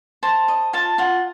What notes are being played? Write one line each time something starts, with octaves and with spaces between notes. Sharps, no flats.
C5 A5
D#5
F4 A5
F4 F#5